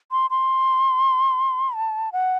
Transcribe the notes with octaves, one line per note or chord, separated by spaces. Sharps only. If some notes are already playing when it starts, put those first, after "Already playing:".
C6
C6
A5
F#5